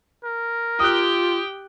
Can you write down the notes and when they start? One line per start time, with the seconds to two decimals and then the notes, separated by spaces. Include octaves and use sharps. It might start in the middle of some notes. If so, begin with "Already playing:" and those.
0.24 A#4
0.80 F4 G4 G5 D#6 F#6